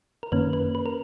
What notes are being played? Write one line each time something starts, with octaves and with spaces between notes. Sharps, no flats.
A#4
F#2 D#3 A#3 C#4 B4
B4
B4
A#4